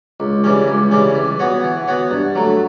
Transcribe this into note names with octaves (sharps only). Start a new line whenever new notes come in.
C#2
C#3 E3 G3 C#4
C#2
C#3 E3 G3 C#4
E3
B3 F#4 C#5
E3
B3 F#4 C#5
G2
F#3 A3